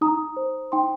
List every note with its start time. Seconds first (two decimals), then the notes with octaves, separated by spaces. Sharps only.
0.01 D#4 A#5 D#6
0.37 C5
0.72 D#4 G5 C6